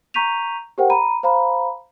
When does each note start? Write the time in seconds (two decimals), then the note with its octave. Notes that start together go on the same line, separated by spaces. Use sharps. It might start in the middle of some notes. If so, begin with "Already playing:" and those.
0.14 A#5 C#6 G6 B6 D#7 F7
0.78 G4 A#4 C5 F#5 G5
0.90 A#5 B5 D#7
1.23 C5 F5 A#5 B5